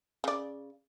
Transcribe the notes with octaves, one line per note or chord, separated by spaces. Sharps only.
C#3 D5